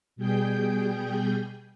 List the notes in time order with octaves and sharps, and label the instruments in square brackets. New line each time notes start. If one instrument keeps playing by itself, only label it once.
[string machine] B2 G3 G#4 G5 G6